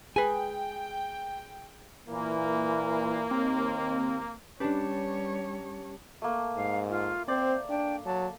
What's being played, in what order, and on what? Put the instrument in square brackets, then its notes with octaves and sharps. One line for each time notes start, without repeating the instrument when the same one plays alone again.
[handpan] G#4 [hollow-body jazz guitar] B4 G#5 [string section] G5
[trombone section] A#2 E3 [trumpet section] A#3
[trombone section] D#2 [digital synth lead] C4
[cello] G3 C#5 [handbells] C#4 G4 A5 [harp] D4 B4
[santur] A3 A#3
[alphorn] G#2 [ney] F5
[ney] F4
[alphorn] C4 [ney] C5 [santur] D5
[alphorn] D4 [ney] G5
[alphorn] F#3 [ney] A5